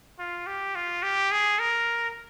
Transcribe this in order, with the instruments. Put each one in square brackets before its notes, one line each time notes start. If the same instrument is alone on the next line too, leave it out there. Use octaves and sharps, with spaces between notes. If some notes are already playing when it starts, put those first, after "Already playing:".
[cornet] F4
G4
F4
G4
G#4
A#4